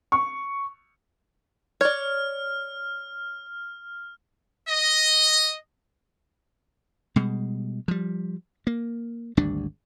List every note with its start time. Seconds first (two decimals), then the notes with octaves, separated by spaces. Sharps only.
0.12 C#6
1.81 C#5 D5 F6
4.70 D#5
7.16 B2 G3 G#3
7.88 F3 G3
8.67 A#3
9.37 G#1 D2 G3 D4